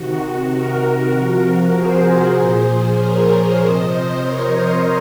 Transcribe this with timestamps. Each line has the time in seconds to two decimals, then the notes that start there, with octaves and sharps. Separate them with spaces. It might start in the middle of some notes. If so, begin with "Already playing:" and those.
Already playing: C3 D#3 F#4
0.20 F#4
0.51 F#4 A#4
1.13 C3 F3
1.74 G#4 C5
2.36 A#2 F3
2.98 A#4 C#5
3.59 C3 F3 C5 D#5
4.20 A#4 C#5